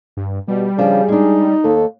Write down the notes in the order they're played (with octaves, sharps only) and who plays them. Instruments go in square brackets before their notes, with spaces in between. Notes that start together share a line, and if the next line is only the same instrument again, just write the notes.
[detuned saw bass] G2
[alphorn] B2 [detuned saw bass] G3
[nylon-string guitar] C#3 F3 D4 [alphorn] G#4
[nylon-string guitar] G#3 D4 [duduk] D#4
[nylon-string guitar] D#2 [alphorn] A4